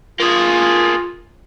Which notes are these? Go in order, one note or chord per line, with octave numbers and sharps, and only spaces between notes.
A#3 F4 G#4